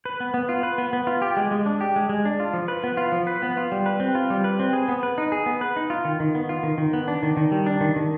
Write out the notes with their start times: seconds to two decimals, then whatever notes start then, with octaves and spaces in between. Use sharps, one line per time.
0.05 B4
0.20 B3
0.34 B3
0.49 F4
0.63 B4
0.78 B3
0.93 B3
1.07 F4
1.22 G4
1.37 G#3
1.51 G#3
1.66 D4
1.81 G4
1.96 G#3
2.09 G#3
2.25 D4
2.40 F4
2.54 F3
2.68 B4
2.84 B3
2.97 F4
3.12 F3
3.27 B4
3.42 B3
3.57 F4
3.72 G3
3.86 B4
4.00 C4
4.15 F4
4.30 G3
4.44 B4
4.59 C4
4.73 G#4
4.88 B3
5.03 B4
5.18 D#4
5.32 G#4
5.46 B3
5.61 B4
5.76 D#4
5.90 F4
6.05 D#3
6.20 D#3
6.35 B3
6.49 F4
6.63 D#3
6.78 D#3
6.93 B3
7.08 D4
7.23 D#3
7.37 D#3
7.52 G3
7.66 D4
7.81 D#3
7.96 D#3